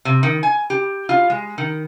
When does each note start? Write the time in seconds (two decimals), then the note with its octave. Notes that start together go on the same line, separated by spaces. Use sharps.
0.05 C3
0.23 D#3
0.43 G#5
0.70 G4
1.09 F4
1.30 G#3
1.58 D#3